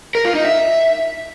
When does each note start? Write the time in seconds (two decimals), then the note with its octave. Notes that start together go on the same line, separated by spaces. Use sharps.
0.15 A#4
0.25 F4
0.35 D#4
0.45 E5